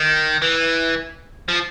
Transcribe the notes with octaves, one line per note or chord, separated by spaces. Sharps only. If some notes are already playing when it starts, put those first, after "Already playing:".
Already playing: D#3
E3
F3